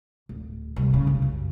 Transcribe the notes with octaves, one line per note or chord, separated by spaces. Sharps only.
D1
C2
C#3
C2
F#2